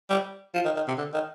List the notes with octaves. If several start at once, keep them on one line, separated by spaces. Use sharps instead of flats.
G3
F3
D#3
D#3
C3
D3
D#3